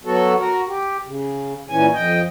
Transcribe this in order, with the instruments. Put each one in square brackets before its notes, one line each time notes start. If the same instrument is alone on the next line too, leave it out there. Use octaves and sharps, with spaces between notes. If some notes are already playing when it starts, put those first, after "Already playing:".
[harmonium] F#3 B3 F#4 A4
F#4 A#4
G4
C#3
A#2 E3 C#4 G#5
F2 D#5 G5